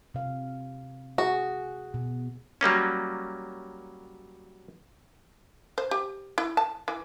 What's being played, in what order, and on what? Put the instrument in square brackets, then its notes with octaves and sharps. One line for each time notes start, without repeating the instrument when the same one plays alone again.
[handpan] C3 F5
[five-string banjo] F#4 [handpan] G#4
[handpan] B2
[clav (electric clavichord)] F#3 G3 A#3 C#4
[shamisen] C5
G4
E4
A5
E3